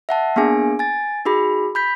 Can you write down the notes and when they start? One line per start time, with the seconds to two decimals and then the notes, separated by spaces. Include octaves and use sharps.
0.09 E5 F#5 A5
0.36 A#3 B3 D4 G#4 G#5
0.79 G#5 A6
1.25 D#4 F#4 G#4 B5
1.75 B5 G6 B6